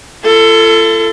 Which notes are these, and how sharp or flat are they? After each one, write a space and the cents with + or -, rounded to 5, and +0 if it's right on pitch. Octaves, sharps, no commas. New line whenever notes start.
F4 -45 A4 +15